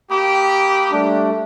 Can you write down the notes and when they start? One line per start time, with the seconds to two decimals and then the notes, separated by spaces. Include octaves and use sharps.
0.10 A#3 G4 B5 D#6
0.92 G3 A3 D4